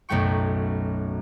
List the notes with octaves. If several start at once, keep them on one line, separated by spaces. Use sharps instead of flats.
B1 F#2 A3 G5 C#6